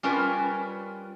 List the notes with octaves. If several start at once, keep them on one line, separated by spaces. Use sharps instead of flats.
G3 C#4 F4 A#4 B4